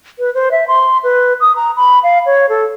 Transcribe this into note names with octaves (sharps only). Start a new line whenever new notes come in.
B4
C5
E5
C6
B4
D#6
A#5
B5
F5
C#5
A4